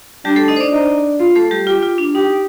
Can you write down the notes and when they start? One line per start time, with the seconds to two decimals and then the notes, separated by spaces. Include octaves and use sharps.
0.25 G3 D4 G4
0.36 A3 A4
0.48 D#4 D#5
0.56 C5
0.60 D4 D5
0.72 D#4
1.19 F4
1.35 A3 A4
1.51 G3 G4
1.67 F4 G4
1.83 F4
1.98 D4
2.15 D#4 G4